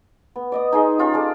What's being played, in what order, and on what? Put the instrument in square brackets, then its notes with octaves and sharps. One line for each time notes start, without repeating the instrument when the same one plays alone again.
[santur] B3
D5 D#5 D#6
D#4 G#4 C6
C#4 F4 G4
G#4 A4 D5